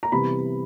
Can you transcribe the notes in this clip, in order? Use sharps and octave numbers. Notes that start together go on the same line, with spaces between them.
A#5
C3 E3 G3 B3 B5